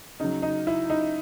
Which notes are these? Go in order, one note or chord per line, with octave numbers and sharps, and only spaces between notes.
C#3 F#3 D#4
D#4
E4
D#4